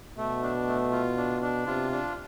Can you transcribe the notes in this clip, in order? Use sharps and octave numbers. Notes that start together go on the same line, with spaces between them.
B2 A3
D4
A3
F4
D4
D4
C3 F4
D4